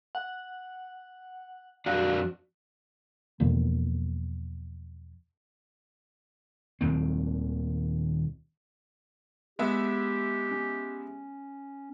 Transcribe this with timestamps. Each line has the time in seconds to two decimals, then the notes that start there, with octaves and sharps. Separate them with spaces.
0.15 F#5
1.86 F2 D4 F#4 F5
3.40 E2 B2 F3 A#3
6.81 D#1 D#2 C4
9.59 G#3 B3 G4 E5
10.51 C#4